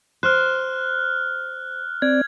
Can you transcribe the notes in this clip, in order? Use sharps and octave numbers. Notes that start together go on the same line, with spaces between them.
C5 F6 F#6
C4 D5 G#6